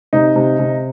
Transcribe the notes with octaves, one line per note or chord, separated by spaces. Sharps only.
C3 D#4
C3
C3